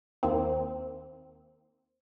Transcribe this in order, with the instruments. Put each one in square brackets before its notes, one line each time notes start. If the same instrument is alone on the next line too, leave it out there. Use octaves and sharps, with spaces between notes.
[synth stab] D#2 D#3 A#3 C4